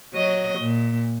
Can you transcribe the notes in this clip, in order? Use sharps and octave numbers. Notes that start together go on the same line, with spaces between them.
F#3 D#5
A#2